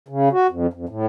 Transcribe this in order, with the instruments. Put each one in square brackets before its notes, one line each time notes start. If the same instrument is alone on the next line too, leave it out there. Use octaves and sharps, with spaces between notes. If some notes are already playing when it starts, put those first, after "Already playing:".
[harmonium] C#3
F#4
F2
F2
A2